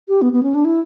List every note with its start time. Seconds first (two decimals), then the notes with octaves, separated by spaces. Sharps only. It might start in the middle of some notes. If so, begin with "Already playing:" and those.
0.08 G4
0.22 B3
0.33 B3
0.43 C#4
0.55 D4
0.65 E4